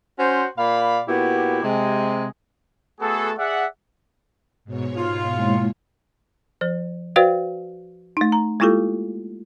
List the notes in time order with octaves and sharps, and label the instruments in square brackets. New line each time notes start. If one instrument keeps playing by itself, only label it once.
[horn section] C#4 F#4 C5
A#2 D5 F5 B5
A#2 B3 E4 F#4 G4
C3 G#3
[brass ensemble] A3 B3 F#4 G#4 A4
G#4 D5 E5 F#5
[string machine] G#2 B2 C#5
[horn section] F4
[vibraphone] G#3 A#3 E4
[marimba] F3 C5
F#4 B4 C5 D5 F5 G5
A3 D#4
A#5
G#3 A#3 E4 F4 G4 A4